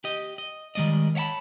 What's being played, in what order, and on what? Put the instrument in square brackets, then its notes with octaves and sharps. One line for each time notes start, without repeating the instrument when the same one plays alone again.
[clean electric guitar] G4 D#5
D#5
D#3 G3 G#3 D5 D#5
C#5 E5 F#5 A5 B5